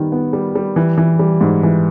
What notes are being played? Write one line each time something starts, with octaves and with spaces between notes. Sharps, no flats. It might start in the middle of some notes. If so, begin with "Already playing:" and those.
Already playing: D#3 G3 B3
B3
G3
G3
E3
E3
G3
G#2
E3